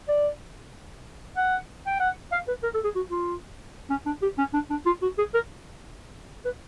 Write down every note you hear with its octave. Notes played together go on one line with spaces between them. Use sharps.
D5
F#5
G5
F#5
F5
B4
A#4
A4
G#4
F#4
F4
C#4
D4
G4
C#4
D4
D4
F4
F#4
G#4
A#4
B4